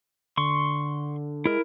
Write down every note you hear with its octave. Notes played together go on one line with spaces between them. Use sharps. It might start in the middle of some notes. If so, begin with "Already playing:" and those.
D3 C6 C#6
G#3 E4 A#4